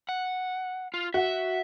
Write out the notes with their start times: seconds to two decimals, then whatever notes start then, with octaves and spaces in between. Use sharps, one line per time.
0.09 F#5
0.94 F4
1.14 F#4 E5